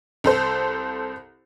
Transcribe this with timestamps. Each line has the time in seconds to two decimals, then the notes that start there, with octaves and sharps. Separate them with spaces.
0.24 C2 A4 C5